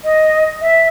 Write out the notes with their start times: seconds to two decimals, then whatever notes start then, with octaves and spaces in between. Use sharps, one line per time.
0.04 D#5
0.61 E5